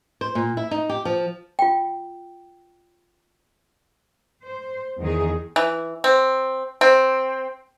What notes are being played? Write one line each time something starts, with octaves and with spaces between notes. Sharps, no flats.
C5
A#2
E4
D#4
G4
F3
F4 G5
C5
E2 D#3 D#4 G#4
E3
C4
C4